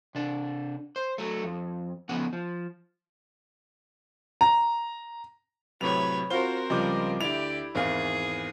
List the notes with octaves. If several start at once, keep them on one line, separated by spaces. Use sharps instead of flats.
C3 D4
C5
F#3 A3
F2
C#3 F3 A3 B3 F#5
F3
A#5
A2 C3 F#3 B4 C#5 F7
C4 F4 F#4 A#4 C5 F5 G7
C#2 F3 G3 D#5 D6 G6
D2 E4 G4 D5 F7
G#1 E2 G#4 F5